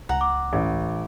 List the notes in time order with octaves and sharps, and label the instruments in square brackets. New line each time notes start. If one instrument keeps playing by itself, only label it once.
[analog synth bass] C#2 [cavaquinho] F#5 A#5
[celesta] D6
[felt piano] A1